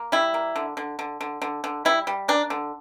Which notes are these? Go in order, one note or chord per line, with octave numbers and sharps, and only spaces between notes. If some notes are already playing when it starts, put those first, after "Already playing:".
Already playing: A#3
G3 E4
A#3
D3
D3
D3
D3
D3
D3
G3 E4
G3
A#3 D4
D3